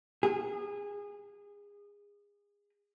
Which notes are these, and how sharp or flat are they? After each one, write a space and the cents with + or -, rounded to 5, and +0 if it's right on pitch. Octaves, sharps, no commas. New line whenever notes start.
G#4 -25